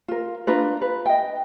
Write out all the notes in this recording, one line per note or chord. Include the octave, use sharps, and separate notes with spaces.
F4 A#4
D4 F4 A#4 B4
B4
D#5 G5